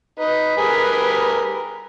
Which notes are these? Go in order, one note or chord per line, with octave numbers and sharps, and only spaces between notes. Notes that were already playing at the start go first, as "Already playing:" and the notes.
D#4 B4
G3 G#4 A#4